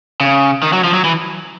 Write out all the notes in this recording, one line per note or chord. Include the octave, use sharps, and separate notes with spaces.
C#3
D#3
F#3
F3
F#3
E3